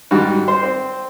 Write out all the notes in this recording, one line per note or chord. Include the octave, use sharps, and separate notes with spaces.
G#2 D#3 G3 F#4
C5
C4